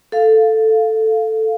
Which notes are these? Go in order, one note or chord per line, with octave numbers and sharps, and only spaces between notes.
A4 F5